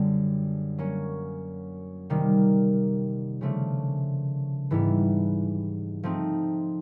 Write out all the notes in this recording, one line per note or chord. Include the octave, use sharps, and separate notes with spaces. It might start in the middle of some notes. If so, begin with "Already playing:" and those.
Already playing: F#2 D3 G3
F#3 A#3 C#4
C3 D#3 G3 A#3
C#3 F3 A3 D4
G#2 E3 G3 B3 E4
F3 A3 C4 D#4